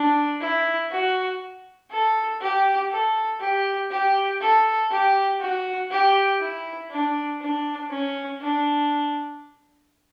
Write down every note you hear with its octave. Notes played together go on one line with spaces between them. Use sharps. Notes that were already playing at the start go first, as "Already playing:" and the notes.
Already playing: D4
E4
F#4
A4
G4
A4
G4
G4
A4
G4
F#4
G4
E4
D4
D4
C#4
D4